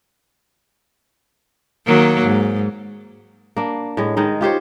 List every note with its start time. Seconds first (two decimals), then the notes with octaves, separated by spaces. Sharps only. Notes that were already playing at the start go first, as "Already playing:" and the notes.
1.86 D#3 F#3 A#3
2.26 G#2
3.57 A#3 D4
3.97 A2 G#3
4.17 D#3 G#3 D#4
4.41 F4 G4 C5 C#5